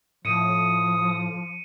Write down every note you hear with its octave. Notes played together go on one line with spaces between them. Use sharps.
A2 F3 D#6 C#7 D#7